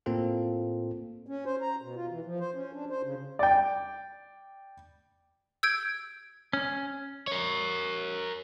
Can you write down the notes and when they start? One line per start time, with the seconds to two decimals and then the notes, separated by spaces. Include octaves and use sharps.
0.06 A2 A#3 C4 F4 A4
1.27 C#4
1.46 C5
1.62 A#5
1.82 B2
1.96 F4
2.10 E3
2.24 F3
2.40 C5
2.55 C#4
2.73 D4
2.90 C5
3.03 C#3
3.39 D5 G5
5.63 E6 G6 G#6 D7
6.53 C#4
7.27 A#4 C#5